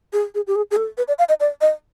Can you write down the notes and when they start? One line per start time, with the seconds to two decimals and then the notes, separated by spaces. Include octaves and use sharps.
0.13 G#4
0.35 G#4
0.47 G4
0.56 G#4
0.71 G#4
0.77 A4
0.98 B4
1.08 D5
1.19 F5
1.29 D#5
1.40 D5
1.61 D#5